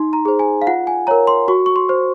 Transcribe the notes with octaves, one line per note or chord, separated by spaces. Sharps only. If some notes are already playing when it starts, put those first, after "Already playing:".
Already playing: D#4 C6
A#5
G#4 C5
G#5
F5
F4 F#5
G#5
A#4 C#5 A#5
C6
F#4 C#6
C#6
C6
C5